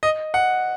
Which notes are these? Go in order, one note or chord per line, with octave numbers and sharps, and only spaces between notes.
D#5
F#5